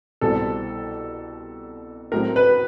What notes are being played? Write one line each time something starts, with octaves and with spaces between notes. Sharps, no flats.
C2 B2 G3 C4 A4
A2 F#3 A3 C4 A#4
B4